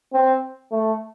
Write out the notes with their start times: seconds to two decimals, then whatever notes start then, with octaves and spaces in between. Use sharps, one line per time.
0.13 C4
0.71 A3